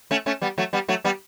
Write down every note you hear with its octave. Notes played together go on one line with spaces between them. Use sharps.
A3 C#4
A3 C#4
G3 B3
F#3 A3
G3 B3
F#3 A3
G3 B3